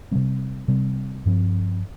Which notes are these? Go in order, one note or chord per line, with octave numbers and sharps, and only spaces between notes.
C3 G3 C4
C3 G3 C4
G2 F3 C4